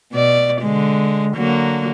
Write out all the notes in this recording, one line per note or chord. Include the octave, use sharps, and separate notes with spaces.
B2 D5
D3 G#3
D3 F#3 A#3